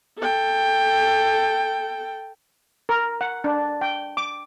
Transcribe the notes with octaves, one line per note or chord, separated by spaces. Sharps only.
A4 G5
A#4
F#5
D4
G5
D6